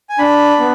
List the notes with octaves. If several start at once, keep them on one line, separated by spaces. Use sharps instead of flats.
G#5
D4 B5
B3